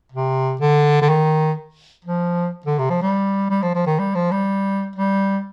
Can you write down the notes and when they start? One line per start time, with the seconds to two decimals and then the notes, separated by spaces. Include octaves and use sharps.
0.12 C3
0.60 D3
1.01 D3
1.09 D#3
2.05 F3
2.66 D3
2.78 C3
2.90 F3
3.02 G3
3.50 G3
3.62 F3
3.75 F3
3.86 D#3
3.99 G3
4.15 F3
4.31 G3
4.96 G3